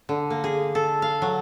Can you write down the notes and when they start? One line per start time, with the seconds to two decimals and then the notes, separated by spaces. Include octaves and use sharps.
0.09 D3
0.30 A#3
0.44 G#4
0.75 A4
1.02 F5
1.22 F#3